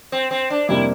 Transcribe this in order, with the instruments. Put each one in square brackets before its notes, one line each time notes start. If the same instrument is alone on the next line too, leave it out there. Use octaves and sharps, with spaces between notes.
[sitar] C4
C4
D4
[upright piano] F2 C3 G3 A#3 [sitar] E4